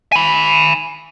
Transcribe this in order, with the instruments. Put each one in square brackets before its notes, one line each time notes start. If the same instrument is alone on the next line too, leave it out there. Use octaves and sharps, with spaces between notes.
[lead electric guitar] G#5 B5